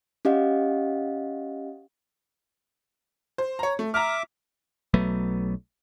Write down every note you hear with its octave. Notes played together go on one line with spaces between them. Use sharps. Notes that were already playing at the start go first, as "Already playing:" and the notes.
C#4 G4 D#5 F5 F#5
C5
C#5 A#5
A3
E5 A#5 D6 F6
B1 F#3 A3 B3